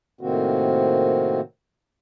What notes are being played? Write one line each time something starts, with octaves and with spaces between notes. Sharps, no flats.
A2 C3 D#3 A#3 C4 F#4